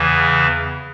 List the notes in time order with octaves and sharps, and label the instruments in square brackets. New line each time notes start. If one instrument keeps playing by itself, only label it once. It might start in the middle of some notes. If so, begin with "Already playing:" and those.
Already playing: [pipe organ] E2 C#3 E3